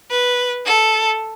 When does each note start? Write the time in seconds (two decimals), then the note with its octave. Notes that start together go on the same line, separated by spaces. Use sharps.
0.10 B4
0.66 A4